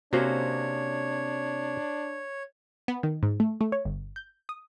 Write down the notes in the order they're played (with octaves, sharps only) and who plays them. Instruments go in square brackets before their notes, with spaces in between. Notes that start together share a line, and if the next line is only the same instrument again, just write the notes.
[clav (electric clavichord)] C3 A#3 C#4 [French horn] D4 [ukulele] F#4 C5 [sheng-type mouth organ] C#5
[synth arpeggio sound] B3
D#3
G#2
A3
A3
C#5
G1
G6
D#6